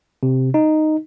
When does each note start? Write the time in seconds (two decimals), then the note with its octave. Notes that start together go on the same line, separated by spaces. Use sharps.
0.23 C3
0.54 D#4